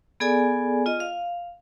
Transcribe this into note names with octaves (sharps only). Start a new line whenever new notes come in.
B3 G#4 A4 D5 G#5
F4 D#5
F5